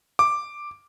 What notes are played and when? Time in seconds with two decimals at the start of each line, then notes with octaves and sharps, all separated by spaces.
0.19 D6